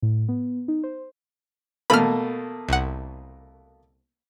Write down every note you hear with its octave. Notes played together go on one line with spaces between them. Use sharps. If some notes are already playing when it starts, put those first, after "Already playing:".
A2
B3
D#4
C5
B2 A3 A#3 B5 F6
C2 F#5